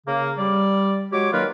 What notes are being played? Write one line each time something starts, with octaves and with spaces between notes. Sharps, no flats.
C#3 A#3
G3 D5
F#3 G#3 G4 C#5 D6
D#3 F#3 A#3 F4 A#4 B4